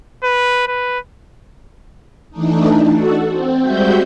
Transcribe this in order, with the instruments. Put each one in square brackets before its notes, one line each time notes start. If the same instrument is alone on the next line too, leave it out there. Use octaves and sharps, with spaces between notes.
[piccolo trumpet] B4
B4
[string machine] E3 A3 D4 D#4
F#4 A4
C4
G3 G#3 C4 F#4 E5 G6